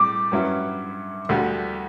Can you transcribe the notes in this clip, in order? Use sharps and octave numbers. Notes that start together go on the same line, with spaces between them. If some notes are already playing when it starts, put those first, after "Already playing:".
Already playing: A2 G3 D6
G2 F#3 C#4 E4
D2 D3 G3